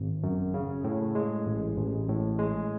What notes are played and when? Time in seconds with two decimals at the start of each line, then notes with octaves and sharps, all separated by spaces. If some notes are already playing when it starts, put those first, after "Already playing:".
Already playing: G#1
0.23 F#2
0.54 C#3
0.84 A2
1.15 G#3
1.46 A1
1.77 A1
2.08 A2
2.39 G#3